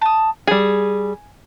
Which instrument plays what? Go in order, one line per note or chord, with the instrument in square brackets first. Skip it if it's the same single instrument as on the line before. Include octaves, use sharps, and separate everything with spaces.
[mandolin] A5 D#6
[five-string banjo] G3 G#4 [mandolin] G#5